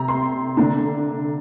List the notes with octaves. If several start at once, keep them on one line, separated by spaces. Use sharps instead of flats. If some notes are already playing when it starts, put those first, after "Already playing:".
Already playing: C3 A#5
C6
D3 A#3 D4 A#5